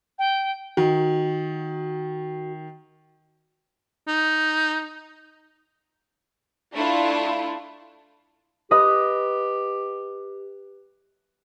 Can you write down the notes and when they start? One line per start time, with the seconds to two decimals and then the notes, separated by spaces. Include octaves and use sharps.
0.19 G5
0.77 D#3 F#4
4.08 D#4
6.74 A3 D4 E4 F4
8.71 G4 B4 D#5 D#6